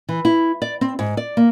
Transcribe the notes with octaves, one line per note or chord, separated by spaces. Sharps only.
E3
E4
D5
C4
G#2
D5
A#3